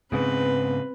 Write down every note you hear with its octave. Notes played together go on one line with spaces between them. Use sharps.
G#2 C#3 B3 C4 B4